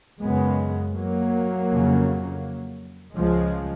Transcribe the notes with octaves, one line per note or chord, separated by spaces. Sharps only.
F#2 C#3 G#3 B3
F#3 A#3
F2 C#3
C#2 C#3 F3 G#3